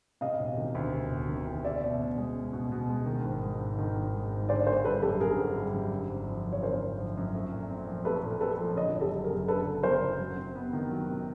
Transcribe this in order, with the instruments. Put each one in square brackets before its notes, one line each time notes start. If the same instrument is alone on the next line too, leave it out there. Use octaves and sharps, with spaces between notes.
[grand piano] C3 [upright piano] D#5 F5
[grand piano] E1
D#3
D2
C3
E1
D#3
D2
[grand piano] C#4 [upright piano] D5 E5
[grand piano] B2
B2
G#3
C#4
B2
B2
G#3
D#3
G#1
G#3
G#2
D#3
G#1
G#3
G#2
[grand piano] D3 [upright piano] C5 D5
[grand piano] G#1 [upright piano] A#4 C5
[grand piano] G3 [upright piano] A4 B4
[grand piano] F#2 [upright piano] G4 A4
[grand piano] D3 [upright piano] G#4 A#4
[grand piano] G#1
G3
F#2
D3
G#1
F3
F#2
[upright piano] C#5
[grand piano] D3 [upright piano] A#4 C5
[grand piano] G#1
F3
F#2
A3
A#2
C4
F3
[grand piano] A3 [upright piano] A4 B4
[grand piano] A#2
[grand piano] C4 [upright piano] A4 B4
[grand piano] F3
[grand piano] D3 [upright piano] C#5 D#5
[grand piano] F#1
[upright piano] G4 A4
[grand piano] F#3
[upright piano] G#4 A#4
[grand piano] F#2
[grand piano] D3 [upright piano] A4 B4
[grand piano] F#1
[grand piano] F#3 [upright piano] A#4 C5
[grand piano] F#2
F#3
C3
B3
D#3
F#3
C3